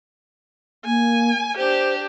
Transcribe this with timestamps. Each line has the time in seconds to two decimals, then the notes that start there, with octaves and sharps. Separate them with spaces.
0.85 A#3 G#5
1.57 D4 G4 C5